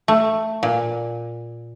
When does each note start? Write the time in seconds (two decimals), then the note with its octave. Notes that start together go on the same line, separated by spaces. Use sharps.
0.08 A3
0.63 A#2